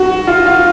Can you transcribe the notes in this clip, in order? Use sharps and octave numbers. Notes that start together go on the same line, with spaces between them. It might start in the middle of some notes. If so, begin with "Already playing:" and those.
Already playing: F#4
F4
F4